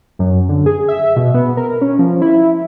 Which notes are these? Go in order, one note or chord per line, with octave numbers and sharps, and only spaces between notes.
F#2
D3
G#4
E5
B2
B3
A#4
C#4
F3
E4